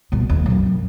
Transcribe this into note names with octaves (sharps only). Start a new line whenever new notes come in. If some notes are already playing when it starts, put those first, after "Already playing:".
C2 B2
D#2
B1 F#2
F#2